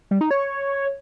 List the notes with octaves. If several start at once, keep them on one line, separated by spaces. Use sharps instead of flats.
G3
D#4
C#5